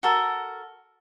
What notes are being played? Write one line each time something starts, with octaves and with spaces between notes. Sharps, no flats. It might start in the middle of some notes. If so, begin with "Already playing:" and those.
F#4 A4 A#4